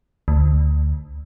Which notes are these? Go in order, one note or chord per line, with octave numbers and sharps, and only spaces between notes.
D2